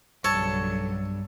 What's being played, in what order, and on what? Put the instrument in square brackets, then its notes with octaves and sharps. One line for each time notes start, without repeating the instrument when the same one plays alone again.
[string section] B1 C#3 F#3 [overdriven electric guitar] G2 [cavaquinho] A4 [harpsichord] C#5 A5